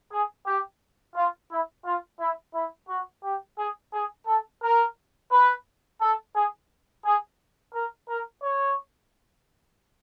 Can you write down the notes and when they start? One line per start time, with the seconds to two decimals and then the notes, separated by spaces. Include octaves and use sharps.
0.12 G#4
0.47 G4
1.15 F4
1.50 E4
1.85 F4
2.20 E4
2.54 E4
2.89 F#4
3.24 G4
3.58 G#4
3.93 G#4
4.27 A4
4.62 A#4
5.31 B4
6.01 A4
6.35 G#4
7.05 G#4
7.73 A#4
8.09 A#4
8.43 C#5